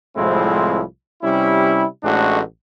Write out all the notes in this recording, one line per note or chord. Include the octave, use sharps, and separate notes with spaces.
C2 A2 F3 G#3 C4 E4
C3 G3 C#4 E4
A1 A2 G#3 C#4 D4 F#4